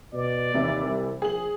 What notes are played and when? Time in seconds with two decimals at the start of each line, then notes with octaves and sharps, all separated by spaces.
0.13 B2 D5
0.54 D#2 C3 E3 E5
0.85 C2
1.22 A#1 G#4 F#7